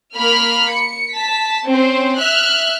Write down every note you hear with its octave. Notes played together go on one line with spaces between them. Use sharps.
A#3 B5 F6
C#7
A5 B6
C4 C#4 C5
E5 F6 F#6